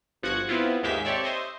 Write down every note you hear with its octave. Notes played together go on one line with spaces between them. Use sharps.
G1 F3 F#4 F#5 F#6 G#6
B3 C4 E4 F4
D#2 G#2 G#3 G4 E5 B6
C4 G4 A4 C#5 D5 E5
C5 D#5 E5